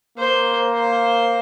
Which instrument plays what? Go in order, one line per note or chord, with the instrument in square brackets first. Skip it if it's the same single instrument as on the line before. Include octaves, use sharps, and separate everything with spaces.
[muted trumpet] A#3 [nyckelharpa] C5
[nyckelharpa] C5